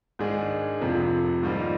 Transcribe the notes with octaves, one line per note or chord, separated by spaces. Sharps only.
G#2 D#3 G#3 D4 G#4
F1 F2 C3 F3
G#2 D#3 G3 A#3 F4